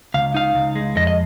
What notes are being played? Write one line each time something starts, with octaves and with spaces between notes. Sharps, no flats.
C#2 F5
D#4 F5
C#2
G#3
F2 D#5
D#5